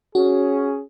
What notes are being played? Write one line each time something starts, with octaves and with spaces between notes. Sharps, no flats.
C#4 F#4 G#4